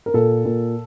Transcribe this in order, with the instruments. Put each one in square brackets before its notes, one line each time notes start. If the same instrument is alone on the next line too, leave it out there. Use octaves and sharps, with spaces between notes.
[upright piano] A#4
A#2 A4
A#2